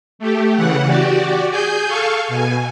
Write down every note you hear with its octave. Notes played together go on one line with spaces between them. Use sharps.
A3 G4
C#3 E3 F#5
F#4 G4 D5
G#4 G#5 G6
A4 F5 C#6
B2 G#5